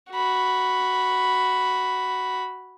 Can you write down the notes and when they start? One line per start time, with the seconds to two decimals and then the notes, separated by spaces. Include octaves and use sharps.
0.11 F#4 B5